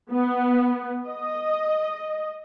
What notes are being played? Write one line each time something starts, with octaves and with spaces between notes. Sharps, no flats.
B3
D#5